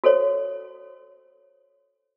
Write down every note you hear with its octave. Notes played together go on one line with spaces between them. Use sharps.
F#4 A4 C5 C#5